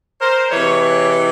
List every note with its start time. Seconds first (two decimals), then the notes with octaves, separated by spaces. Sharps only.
0.21 A#4 C5
0.50 C3 E3 G#3 B4 C#5
0.80 B4 C#5